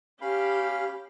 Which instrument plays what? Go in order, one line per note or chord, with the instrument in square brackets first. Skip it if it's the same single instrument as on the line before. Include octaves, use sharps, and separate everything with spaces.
[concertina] C#4 F5 B5 [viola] G4